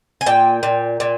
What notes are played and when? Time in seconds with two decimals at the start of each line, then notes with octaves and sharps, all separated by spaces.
0.21 G#5
0.26 A#2 G5
0.63 A#2
1.00 A#2